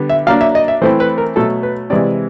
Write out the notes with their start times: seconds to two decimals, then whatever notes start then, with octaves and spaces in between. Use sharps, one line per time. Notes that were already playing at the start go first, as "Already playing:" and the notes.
Already playing: D3 G3 B3
0.09 E5
0.27 F#3 A#3 D4 F5
0.41 E5
0.55 D#5
0.68 E5
0.82 E3 A3 C4 E4 C5
1.00 B4
1.18 A#4
1.36 B2 F#3 A3 A4
1.63 B4
1.90 C3 E3 G#3 D5